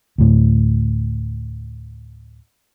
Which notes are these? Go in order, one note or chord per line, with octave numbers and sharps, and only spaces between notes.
D2 A2